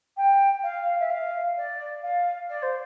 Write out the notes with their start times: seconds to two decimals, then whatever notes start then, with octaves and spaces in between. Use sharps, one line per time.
0.17 G5
0.63 F5
0.99 E5
1.10 F5
1.57 D5
2.02 F5
2.49 D5
2.62 C5